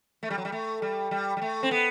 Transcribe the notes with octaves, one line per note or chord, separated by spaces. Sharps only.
A3
G3
F#3
G3
A3
G3
G3
G3
A3
C4
B3